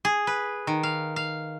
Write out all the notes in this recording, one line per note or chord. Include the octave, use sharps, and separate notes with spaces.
G#4
B4
D#3
F5
F5